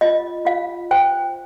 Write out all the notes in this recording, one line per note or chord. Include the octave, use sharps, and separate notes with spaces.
F4 D#5
F4 F5
C5 G5